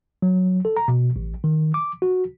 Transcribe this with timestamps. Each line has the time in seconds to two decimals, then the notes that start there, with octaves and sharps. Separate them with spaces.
0.22 F#3
0.65 A4
0.77 A#5
0.88 B2
1.16 A1
1.44 D#3
1.74 D6
2.02 F#4